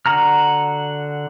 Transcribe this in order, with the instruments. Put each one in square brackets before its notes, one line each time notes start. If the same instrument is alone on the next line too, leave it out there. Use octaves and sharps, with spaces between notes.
[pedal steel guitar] D3 F#4 A#5 F6